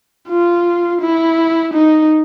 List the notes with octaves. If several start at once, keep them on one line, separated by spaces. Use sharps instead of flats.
F4
E4
D#4